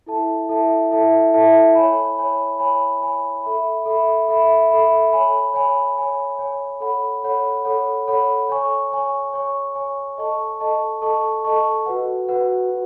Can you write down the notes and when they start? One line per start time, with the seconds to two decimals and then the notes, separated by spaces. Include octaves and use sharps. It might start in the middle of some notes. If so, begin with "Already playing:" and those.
0.06 E4 A4 E5 A5
0.49 E4 A4 E5 A5
0.91 E4 A4 E5 A5
1.34 E4 A4 E5 A5
1.75 C#5 G#5 B5
2.18 C#5 G#5 B5
2.59 C#5 G#5 B5
3.02 C#5 G#5 B5
3.44 A4 E5 B5
3.86 A4 E5 B5
4.28 A4 E5 B5
4.71 A4 E5 B5
5.13 C#5 G#5 B5
5.54 C#5 G#5 B5
5.97 C#5 G#5 B5
6.39 C#5 G#5 B5
6.80 A4 C#5 F#5 B5
7.24 A4 C#5 F#5 B5
7.65 A4 C#5 F#5 B5
8.08 A4 C#5 F#5 B5
8.49 C#5 G#5 C#6
8.92 C#5 G#5 C#6
9.33 C#5 G#5 C#6
9.75 C#5 G#5 C#6
10.18 A4 D#5 A5 C#6
10.60 A4 D#5 A5 C#6
11.02 A4 D#5 A5 C#6
11.44 A4 D#5 A5 C#6
11.86 F#4 B4 F#5
12.28 F#4 B4 F#5
12.70 F#4